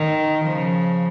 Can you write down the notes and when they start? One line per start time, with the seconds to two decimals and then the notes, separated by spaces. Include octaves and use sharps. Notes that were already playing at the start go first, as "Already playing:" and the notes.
Already playing: D#3
0.45 C#3 F3